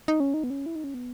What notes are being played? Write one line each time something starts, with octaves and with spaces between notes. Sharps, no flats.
D#4
C#4
D#4
B3
C#4
E4
D#4
C#4
B3